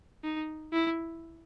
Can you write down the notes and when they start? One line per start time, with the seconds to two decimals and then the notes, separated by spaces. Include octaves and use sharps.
0.24 D#4
0.73 E4